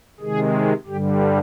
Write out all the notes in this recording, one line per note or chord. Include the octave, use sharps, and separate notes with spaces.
C3 D#3 G#3 G#4
G2 D3 G3 G4